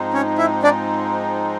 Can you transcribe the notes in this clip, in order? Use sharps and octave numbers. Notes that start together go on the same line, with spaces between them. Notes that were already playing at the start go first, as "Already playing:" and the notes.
Already playing: G#2 F3 G#3 C4 D#4
C#4 C#5
E4 E5
D4 D5